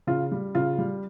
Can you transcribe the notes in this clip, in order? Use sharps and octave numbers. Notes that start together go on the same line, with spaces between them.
C#3 F4
G3
C#3 F4
G3